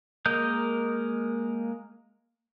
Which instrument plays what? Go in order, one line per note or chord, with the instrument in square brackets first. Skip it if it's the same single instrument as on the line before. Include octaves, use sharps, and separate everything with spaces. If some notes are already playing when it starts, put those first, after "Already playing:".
[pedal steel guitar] G#3 A#3 A#4 D#5 G6